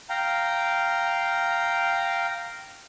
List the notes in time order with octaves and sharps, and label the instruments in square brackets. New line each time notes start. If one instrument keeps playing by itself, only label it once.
[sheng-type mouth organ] F5 G5 A#5